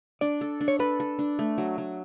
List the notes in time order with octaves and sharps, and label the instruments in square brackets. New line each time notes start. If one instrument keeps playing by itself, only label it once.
[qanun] D4 [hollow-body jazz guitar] D5
[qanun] A4
D4
[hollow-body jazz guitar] C#5
[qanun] A4 [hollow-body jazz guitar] B4
[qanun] A4
D4
A3
F#3
F#3